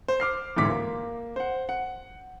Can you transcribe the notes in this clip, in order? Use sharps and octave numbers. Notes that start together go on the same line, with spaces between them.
C5
D6 F6 C7
A1 D2 G#2 D6 B6
A#3
C5 F#5
F#5